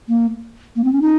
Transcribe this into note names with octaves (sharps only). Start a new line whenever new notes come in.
A#3
A#3
C4
C#4
D#4